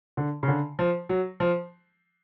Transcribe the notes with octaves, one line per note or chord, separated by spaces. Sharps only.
D3
C#3
D3
F3
F#3
F3